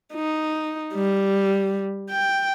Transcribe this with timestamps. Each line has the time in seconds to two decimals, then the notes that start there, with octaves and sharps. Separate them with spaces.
0.13 D#4
0.94 G3
2.10 G5